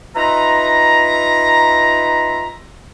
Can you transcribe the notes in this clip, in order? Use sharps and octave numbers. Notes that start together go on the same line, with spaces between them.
D#4 F4 B4 E5 A#5